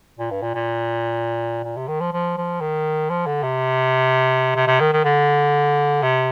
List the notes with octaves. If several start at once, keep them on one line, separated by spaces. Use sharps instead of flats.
A#2
G2
A#2
A#2
A#2
C3
D#3
F3
F3
F3
D#3
F3
D3
C3
C3
C3
D#3
D#3
D3
C3